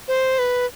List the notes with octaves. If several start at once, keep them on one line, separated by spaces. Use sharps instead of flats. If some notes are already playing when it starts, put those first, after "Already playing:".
C5
B4